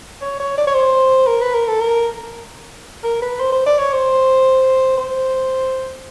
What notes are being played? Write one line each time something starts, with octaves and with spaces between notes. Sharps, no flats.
C#5
C#5
D5
C#5
C5
A#4
B4
A#4
A4
A#4
A#4
B4
C5
C5
D5
C#5
C5
C5